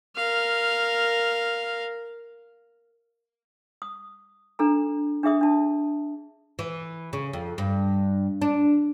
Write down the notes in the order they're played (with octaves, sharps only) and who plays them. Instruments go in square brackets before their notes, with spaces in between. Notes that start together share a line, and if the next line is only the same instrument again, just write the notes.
[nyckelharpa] A#4 F5
[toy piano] D#6
D4 A4 A#5
D4 G#4 E5 D#6
D4 A5
[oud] E3
C#3
F2
G2
D4